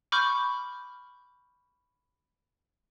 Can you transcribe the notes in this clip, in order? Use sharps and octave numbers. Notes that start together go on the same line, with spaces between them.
B5 C#6 D6 F6 G6